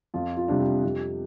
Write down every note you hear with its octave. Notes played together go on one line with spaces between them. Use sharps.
F2 F4
F4
C3 G3 D4
G4
F2